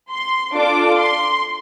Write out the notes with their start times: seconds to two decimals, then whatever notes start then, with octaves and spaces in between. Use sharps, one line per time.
0.10 C6
0.54 D4 F4 A4 D6
0.99 C6